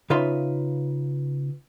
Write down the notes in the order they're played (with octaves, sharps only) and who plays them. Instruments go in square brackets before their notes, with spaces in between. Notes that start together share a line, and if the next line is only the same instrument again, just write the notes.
[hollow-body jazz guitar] C#3 D#4 F4 B4 E5 C6